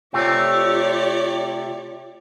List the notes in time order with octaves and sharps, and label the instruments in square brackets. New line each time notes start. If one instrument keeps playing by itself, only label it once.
[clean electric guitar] C3 A3 C4 [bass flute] F4 [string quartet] G4 C#5 D5